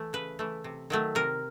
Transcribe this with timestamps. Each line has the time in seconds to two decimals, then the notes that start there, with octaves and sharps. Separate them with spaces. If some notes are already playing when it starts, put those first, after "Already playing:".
Already playing: E3 A3
0.13 C#3 B4
0.39 E3 A3
0.64 C3
0.90 D#3 F#3 A3
1.15 C3 A#4